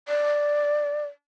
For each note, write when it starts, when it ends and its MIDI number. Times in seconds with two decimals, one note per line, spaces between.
0.08 1.03 74